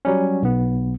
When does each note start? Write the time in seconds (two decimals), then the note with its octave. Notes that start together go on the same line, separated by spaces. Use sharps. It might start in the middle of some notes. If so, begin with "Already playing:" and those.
0.05 F#3 G3 C#4
0.43 B1 B3